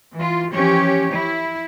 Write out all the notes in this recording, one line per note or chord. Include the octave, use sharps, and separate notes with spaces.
E3 F4
E3 F3 C#4 G4 C#5
E4